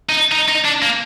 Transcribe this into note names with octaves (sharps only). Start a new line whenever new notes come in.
D#4
D#4
D#4
D4
A#3